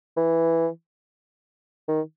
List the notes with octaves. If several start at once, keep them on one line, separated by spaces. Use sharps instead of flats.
E3
D#3